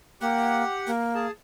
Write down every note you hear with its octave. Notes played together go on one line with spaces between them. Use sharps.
A#3 G4 F#5
A#3
G#4 A5